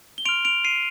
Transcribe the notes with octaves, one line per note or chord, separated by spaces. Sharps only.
G7
C6 F6 D7 F7
D7 F7
C7 D#7